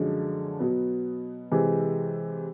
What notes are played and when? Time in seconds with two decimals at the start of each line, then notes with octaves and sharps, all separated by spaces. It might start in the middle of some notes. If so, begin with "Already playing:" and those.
Already playing: F#2 D3 F3 G#3 C#4
0.59 B2 F#3 B3
1.52 C3 E3 G#3